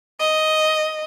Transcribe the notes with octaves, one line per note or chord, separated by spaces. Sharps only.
D#5